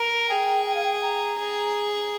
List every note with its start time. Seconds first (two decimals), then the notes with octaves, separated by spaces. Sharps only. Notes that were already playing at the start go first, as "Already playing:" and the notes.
Already playing: A#4 A#5
0.29 G#4 G5
0.66 G5
0.75 F5
0.84 G5
1.02 A#5
1.39 G#4